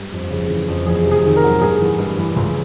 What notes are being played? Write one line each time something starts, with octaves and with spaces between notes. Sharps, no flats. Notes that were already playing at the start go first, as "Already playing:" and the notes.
Already playing: G2
F2
C#3
E3
F2
E2 G#4
C3
G#4
D#3
A#4
F#3
G2 G#4
E3
G2
E3
C#2